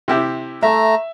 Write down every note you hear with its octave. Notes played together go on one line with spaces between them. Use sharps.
C3 E4 G4
A3 E5 A#5